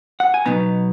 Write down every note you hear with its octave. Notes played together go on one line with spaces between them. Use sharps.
F#5
G#5
B2 F#3 B3 D#4 A#5